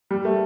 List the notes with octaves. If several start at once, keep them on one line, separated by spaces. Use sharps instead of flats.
G3
A3